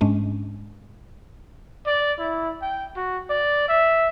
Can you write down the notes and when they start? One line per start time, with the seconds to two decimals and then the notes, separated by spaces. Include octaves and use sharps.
0.01 G#2 G#3 C#4 D4
1.87 D5
2.19 E4
2.62 G5
2.96 F#4
3.30 D5
3.68 E5